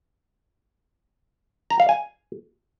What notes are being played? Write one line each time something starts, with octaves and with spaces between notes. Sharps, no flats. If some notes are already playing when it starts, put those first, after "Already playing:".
A#5
F5
G#5